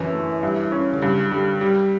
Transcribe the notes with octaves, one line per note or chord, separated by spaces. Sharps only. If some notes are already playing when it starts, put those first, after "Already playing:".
Already playing: F#2 D3 E3
A3
G2
C#4
D3
G2 C#3
D3 G3
G3